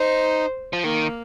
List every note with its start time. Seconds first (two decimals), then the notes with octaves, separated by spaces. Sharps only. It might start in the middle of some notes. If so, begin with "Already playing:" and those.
Already playing: D#4 C5
0.73 F3
0.84 D#3 A#3